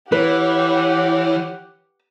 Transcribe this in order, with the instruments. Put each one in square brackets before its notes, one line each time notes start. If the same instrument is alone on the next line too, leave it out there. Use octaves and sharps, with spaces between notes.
[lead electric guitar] E3 [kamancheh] G4 F#5 [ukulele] B4 [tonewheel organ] C#5 F6